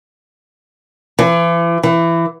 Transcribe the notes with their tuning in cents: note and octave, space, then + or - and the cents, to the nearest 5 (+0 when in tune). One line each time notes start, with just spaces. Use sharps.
E3 +40
E3 +20